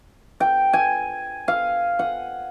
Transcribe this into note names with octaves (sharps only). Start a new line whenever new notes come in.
G5
G#5
F5
F#5